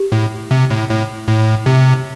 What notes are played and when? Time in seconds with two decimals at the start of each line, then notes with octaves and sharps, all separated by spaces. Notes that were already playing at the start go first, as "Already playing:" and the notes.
Already playing: G4
0.12 A2
0.51 C3
0.70 A2
0.89 A2
1.28 A2
1.66 C3